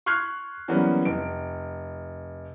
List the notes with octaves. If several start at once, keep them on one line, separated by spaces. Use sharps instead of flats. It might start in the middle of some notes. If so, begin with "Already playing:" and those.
C6 C#6 F6 F#6 G#6 C7
E3 F#3 G3 A#3 B3 C#4
F1 D7